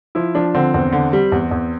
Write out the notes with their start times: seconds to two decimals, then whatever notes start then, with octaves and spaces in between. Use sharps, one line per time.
0.15 F3 E4
0.35 F3 D4
0.55 D3 C4
0.74 E2 C4
0.92 D3
1.13 G3
1.32 E2
1.51 E2